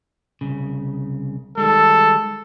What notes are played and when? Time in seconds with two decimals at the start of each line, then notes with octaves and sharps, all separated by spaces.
0.41 C2 C#3
1.58 D#3 G3 G#3 A4